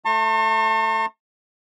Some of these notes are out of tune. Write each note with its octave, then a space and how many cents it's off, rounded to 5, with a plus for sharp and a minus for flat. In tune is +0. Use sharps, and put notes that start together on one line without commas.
A3 -5 A5 +45 C#6 -45